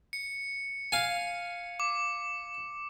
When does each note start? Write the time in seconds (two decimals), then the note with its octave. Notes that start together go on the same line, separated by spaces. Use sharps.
0.13 C#7
0.92 F5 G#5
1.80 D6